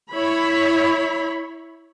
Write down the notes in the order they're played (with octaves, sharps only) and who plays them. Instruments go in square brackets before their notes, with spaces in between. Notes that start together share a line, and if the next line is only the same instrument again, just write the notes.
[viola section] E4 C#5 B5